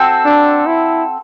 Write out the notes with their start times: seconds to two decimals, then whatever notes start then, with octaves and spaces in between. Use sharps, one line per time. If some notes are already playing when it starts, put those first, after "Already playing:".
Already playing: C4 F#4 A4 C5
0.26 D4
0.67 E4